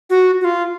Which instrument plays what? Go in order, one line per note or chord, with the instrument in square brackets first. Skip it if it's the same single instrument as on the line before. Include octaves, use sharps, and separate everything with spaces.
[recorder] F#4
F#4
F4